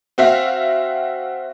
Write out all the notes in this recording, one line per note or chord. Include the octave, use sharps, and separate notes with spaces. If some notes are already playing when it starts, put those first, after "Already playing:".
C4 F#4 E5 F5